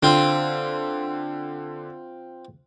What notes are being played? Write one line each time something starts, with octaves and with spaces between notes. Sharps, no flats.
D3 C4 F4